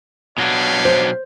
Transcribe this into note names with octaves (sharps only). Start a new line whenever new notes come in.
B2 F#3 D4 G4 C#5 F5
C5